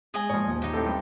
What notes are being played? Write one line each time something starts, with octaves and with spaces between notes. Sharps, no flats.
G#3 G#4 D#5 G#5
G#2 F3 A#3 C#5
A#1 D#2
D#4 G4
A2 C4 A4
G2